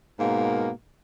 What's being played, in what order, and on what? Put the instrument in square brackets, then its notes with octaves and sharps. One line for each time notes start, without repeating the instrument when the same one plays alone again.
[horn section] G#2 B2 A#3